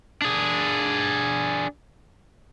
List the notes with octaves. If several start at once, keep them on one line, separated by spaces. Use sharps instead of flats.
D4 G#4